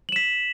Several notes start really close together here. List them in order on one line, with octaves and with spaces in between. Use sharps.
F#7 E7 B6